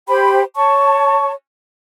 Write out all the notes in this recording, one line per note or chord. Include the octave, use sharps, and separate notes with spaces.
G4 C5 G5 B5
C#5 A5 C#6